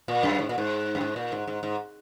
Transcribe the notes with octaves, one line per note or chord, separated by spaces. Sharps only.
A#2
F#2
G#2
A#2
G#2
F#2
G#2
A#2
G#2
G#2
G#2